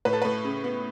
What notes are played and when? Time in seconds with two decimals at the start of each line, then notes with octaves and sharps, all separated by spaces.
0.05 A2 B4
0.13 A4
0.22 A2 B4
0.45 C#3
0.64 B3